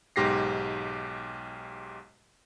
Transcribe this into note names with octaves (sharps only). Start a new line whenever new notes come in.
B1 G#2 G4 A#6 C7